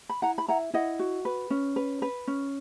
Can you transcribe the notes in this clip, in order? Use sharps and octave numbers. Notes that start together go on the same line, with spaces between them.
B5
E4 F#5 A#5
B5
E4 F#5 A#5
E4 D#5 F#5
F#4
B4
C#4
B4
B4
C#4